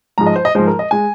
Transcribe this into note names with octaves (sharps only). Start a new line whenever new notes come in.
G#2 F3 G#3 A#5
D#5
C5
D#5
G#2 F3 G#3 C5
A#4
D#5
G#3 G#5